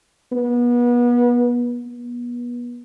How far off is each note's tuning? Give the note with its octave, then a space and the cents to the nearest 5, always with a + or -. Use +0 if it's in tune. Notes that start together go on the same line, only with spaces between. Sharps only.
B3 -30
B3 -35